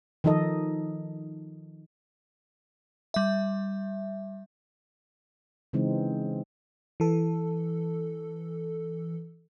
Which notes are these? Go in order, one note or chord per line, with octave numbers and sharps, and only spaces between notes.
D#3 F3 D#4 A4 D#5
G3 E5
C#3 E3 G#3 C4 D#4
E3 A4